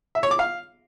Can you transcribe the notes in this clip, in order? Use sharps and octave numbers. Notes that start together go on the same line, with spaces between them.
E5
C#5
D6
F5